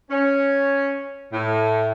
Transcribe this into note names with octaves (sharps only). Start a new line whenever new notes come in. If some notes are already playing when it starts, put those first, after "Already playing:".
C#4
A2